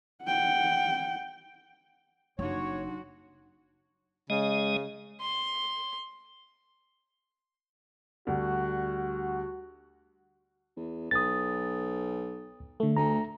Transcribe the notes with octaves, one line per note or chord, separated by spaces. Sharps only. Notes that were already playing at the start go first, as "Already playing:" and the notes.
F#5 G5
F#1 F#3 D4 D#4 F#4 C#5 C6
C#3 G#3 D#5
C6
D2 G3 F#4
E2
B1 D#6 A6
D3 A3
D2 A#5